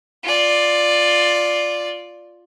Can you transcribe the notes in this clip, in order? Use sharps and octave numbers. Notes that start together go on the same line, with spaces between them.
F4 D5